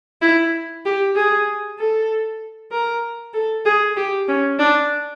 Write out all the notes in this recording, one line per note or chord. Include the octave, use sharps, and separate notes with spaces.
E4
G4
G#4
A4
A#4
A4
G#4
G4
C#4
D4